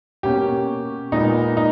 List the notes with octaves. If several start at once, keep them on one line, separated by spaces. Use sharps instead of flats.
B2 A#3 C#4 G4
A#2 G#3 B3 D#4
D#4